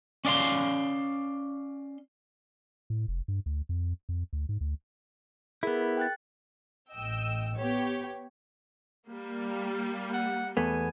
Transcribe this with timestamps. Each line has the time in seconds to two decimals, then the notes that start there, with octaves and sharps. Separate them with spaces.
0.25 C#4 D5 F5 C6
2.90 A2
3.08 F1
3.28 G2
3.46 D2
3.69 F2
4.09 F2
4.33 D2
4.49 G#2
4.61 D2
5.63 B3 E4 G#4 A#4
5.97 G5 F#6 A6
6.92 A1 D#5 G5 E6
7.56 B3 G4 C#5
9.07 G3 A#3
10.13 F#5
10.57 E2 A3 B3 G#5